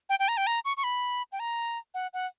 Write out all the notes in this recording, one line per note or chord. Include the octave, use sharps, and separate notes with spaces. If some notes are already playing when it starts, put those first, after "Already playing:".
G5
G5
A#5
G5
A#5
C#6
C#6
B5
G5
A#5
F#5
F#5